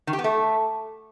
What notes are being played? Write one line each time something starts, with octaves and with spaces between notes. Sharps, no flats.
D#3
G4
B3
A3